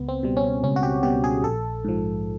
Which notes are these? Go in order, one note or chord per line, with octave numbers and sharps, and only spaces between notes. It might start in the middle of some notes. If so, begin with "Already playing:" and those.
Already playing: C#2 B3
C4
B2 G3
C#4
C#2 C#4
F#4
G4
B2 G3 G4
G#4
A#1 A4
G#2 F3